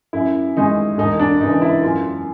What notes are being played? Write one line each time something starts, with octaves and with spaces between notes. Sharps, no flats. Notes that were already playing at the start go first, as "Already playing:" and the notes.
F#2 E4
D#3 G#3 D#4
E1 D#4
D4
E2 C#3 E3 D#4
E4
F#2 F4